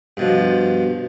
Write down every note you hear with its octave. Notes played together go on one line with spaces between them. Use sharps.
G2 B2 F3